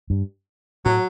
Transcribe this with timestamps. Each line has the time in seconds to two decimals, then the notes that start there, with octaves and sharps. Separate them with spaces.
0.10 G2
0.85 A2 F#3